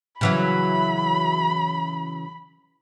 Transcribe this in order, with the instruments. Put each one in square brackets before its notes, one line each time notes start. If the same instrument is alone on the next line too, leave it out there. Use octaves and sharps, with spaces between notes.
[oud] C#3 E3 F#3 [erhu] B5